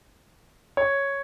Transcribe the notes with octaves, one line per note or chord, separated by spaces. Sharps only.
C#5